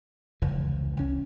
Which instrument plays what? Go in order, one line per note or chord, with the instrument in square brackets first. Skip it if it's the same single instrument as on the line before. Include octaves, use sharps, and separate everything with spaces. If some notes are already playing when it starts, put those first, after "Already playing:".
[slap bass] F1 C#2 E3
C2 C#4